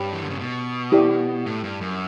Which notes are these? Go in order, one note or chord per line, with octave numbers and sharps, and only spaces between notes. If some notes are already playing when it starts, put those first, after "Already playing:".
Already playing: G2 G4 C#5 G5 B5
E3
D3
C#3
B2
E4 G4 D5
A2
G2
F#2